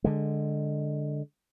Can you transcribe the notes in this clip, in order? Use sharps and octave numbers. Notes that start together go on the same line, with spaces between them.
D3 G#3